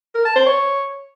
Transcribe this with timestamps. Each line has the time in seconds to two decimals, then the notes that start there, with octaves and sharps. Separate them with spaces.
0.15 A#4
0.25 A5
0.36 C5
0.46 C#5